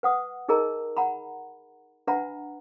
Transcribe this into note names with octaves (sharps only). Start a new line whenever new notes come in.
B4 F#5 D#6
D#4 G#4 A#4 D#5 A#5
F#5 A#5 B5
D4 B4 E5 F#5 A#5 B5